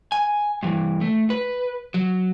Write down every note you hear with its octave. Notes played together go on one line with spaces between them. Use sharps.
G#5
G2 E3
A3
B4
F#3